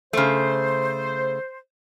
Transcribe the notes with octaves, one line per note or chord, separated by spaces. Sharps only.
C#3 A3 C5